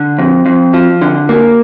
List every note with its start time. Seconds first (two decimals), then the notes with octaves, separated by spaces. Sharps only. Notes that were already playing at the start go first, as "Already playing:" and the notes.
Already playing: D3
0.19 F2
0.46 F2
0.74 F3
1.02 D3
1.29 A#3